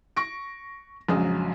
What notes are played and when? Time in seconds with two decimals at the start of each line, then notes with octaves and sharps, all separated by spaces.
0.17 C#6 A#6 D7
1.08 A#1 F2 C#3 F#3 G#3 D#6